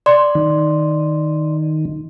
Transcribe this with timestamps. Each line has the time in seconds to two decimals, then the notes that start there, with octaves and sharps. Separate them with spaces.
0.06 D5 C6
0.35 D#3